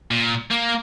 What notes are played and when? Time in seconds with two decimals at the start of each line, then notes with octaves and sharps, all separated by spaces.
0.11 A#2
0.51 A#3